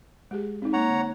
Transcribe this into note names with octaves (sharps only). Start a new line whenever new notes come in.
G#3 G4 G#4
C4 D#4
G#3 A#3 C#5 F#5 A#5
D3